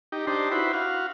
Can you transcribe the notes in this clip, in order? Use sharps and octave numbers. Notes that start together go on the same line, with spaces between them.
D#4 G4
D4 D#4 G4 C5
E4 F#4 B4 C5
F#4 F5